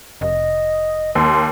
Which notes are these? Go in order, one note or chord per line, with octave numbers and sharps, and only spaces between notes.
F1 D#5
D#2 C6